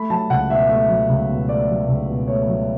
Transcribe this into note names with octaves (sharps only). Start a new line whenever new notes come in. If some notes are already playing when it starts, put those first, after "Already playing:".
Already playing: A3 B5
F#3 A5
C#2 F#5
B2 E5
A3 E5
F#3
C#2
B2
A3 D5
F#3
C#2
B2
A3 C#5
F#3